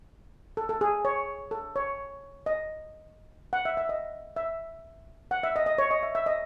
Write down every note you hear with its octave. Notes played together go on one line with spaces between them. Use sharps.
A4
A4
G#4
C#5
A4
C#5
D#5
F#5
E5
E5
D#5
E5
F#5
E5
D#5
D#5
C#5
D#5
E5
E5
D#5